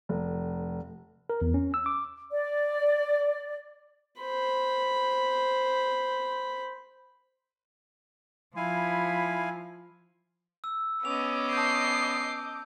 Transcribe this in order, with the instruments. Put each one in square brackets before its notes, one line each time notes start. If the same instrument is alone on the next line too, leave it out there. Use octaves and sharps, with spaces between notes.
[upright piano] F1
[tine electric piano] A#4
E2
C#4
E6
D6
[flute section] D5
[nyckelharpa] C5 B5
[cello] F3 [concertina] E4 F5 G#5 [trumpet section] B5
[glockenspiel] E6
[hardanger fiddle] B3 C#4 [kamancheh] D#5 D6 [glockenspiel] F7
[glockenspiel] A5 G6 [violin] C7